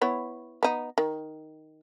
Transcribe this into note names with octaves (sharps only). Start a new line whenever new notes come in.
B3 E4 C#5
B3 D#4
D#3